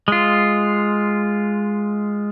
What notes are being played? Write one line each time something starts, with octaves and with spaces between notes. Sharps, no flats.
G#3 F4